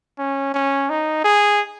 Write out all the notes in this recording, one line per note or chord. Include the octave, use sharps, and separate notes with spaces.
C#4
C#4
D#4
G#4